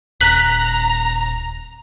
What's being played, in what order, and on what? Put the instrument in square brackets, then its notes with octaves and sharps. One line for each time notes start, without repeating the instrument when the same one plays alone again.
[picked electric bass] D#1 [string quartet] A#5 [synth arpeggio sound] F#6 B6